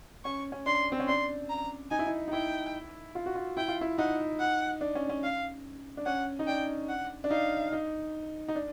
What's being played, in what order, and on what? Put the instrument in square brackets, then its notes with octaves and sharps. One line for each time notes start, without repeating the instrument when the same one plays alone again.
[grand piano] C#4 [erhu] C#6
[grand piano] C#4
[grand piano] D4 [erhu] C6
[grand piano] C4
C#4
[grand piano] D4 [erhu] C6
[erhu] A#5
[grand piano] D#4 [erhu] G#5
[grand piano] E4
D#4
D#4
[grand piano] E4 [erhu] G5
[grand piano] F4
F#4
F4
[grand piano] E4 [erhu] G5
[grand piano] F4
E4
[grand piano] D#4 [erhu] F#5
[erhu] F#5
[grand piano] D4
C#4
C#4
[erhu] F5
[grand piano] D4
[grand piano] C#4 [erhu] F#5
[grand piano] D#4
[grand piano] D4 [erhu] G5
[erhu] F#5
[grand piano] D4
[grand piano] D#4 [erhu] F5
[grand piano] D#4
D#4
D4